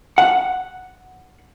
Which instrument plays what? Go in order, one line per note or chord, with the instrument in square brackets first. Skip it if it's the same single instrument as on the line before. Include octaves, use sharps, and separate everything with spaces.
[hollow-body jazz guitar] F#5